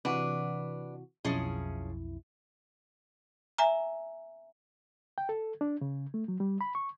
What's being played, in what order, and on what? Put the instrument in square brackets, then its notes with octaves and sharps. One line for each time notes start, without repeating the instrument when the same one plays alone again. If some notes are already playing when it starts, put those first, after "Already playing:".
[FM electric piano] C3 E3 F#4 [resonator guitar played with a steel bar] D4 B4
[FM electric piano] B1 F2 E4 [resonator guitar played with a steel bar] F3 C#4 G#4
[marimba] E5 G#5 A#5
[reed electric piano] G5
A4
D4
C#3
A3
F#3
G3
B5
C#6